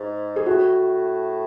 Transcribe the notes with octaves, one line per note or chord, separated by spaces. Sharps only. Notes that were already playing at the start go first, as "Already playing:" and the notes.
Already playing: G#2
G#4
A2 F#4